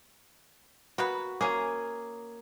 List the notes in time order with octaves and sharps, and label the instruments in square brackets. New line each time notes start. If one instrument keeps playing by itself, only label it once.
[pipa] A#3 B3 B4 [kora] F#4
[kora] A#3 [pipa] C#4 G#4